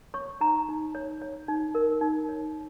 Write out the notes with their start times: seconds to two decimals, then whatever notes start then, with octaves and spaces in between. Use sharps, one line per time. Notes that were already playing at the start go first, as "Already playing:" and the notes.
0.14 C#5 C#6
0.41 D#4 A#5
0.69 D#4
0.95 C#5
1.22 C#5
1.48 D#4
1.75 A#4
2.01 D#4
2.29 C#5